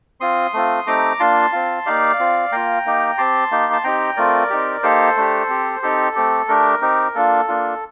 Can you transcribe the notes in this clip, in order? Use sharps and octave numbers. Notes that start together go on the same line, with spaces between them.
C4 F4 C6 D#6
A3 C4 F4
A3 C4 D#4 G4 A#5 D6
A#3 D4 F4 A5 C6
C4 F4
A#3 D#4 G4 D5 F5
C4 F4
A#3 F4 G5 A#5
A#3 D#4 G4
C4 G4 A5 C6
A#3 D#4 G4
A5
C4 D#4 G4 G5 A#5
A3 C4 F4 A#4 D5
C4 D#4 G4
A#3 D#4 G4 A4 C5
A3 D4 G4
C4 G4
C4 D#4 G4 A4
A3 C4 G4
A3 D4 G4 A#4
C4 D#4 G4
A#3 D4 F4 A4
A#3 D4 F4